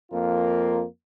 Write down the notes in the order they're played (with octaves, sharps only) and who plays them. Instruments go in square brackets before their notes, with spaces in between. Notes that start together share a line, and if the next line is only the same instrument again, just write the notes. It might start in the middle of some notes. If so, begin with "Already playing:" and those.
[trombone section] F2 A#3 F4 A#4